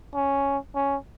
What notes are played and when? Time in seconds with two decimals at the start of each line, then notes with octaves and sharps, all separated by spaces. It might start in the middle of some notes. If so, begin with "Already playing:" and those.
0.14 C#4
0.75 C#4